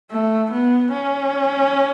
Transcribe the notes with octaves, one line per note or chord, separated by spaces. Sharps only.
A3
B3
C#4